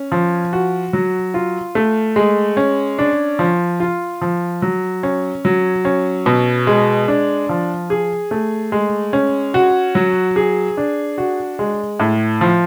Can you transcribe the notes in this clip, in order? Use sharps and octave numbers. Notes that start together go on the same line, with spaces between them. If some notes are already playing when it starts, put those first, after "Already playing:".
Already playing: C#4
F3
F#4
F#3
F4
A3
G#3
C#4
D4
F3
F4
F3
F#3
C#4
F#3
C#4
B2
G#3
D4
F3
G#4
A3
G#3
C#4
F#4
F#3
G#4
D4
F#4
G#3
A2
F3